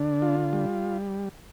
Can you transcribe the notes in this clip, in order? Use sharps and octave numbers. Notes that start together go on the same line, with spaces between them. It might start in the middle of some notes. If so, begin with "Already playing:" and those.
Already playing: D3 D4
F4
G3